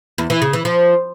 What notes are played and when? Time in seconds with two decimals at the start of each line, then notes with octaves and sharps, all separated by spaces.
0.18 E2
0.30 E3
0.42 C#3
0.53 E3
0.65 F3